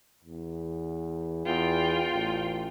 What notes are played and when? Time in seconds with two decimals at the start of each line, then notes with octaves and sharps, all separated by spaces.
0.25 E2
1.46 E2 F4 G5
2.12 A1